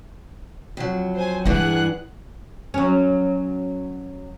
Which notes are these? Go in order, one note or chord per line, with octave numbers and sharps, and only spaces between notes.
F2 F#3
C5 G#5
G2 E3 G#3 G#4 F#5 F#6
F#3 C#4